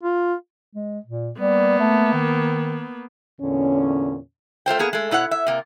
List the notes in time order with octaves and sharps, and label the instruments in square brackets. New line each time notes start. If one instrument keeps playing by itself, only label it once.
[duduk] F4
[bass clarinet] G#3
A#2
[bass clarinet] G3 [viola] A#3 B3
[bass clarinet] A3
D#3
[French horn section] E2 A#2 D3 C#4
[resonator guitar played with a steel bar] A3 F4 C5 G5
A#3 B3 G#4
G#3 A3
B2 E4 C#5 F#5
E5
C3 A#3